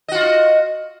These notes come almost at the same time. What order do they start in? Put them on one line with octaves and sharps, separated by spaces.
D#5 F#4 F4